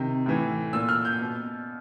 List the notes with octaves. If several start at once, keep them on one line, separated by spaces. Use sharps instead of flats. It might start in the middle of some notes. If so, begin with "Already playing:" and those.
Already playing: C3 D#3
A2 E3
A#2 E6
F6
G6
B2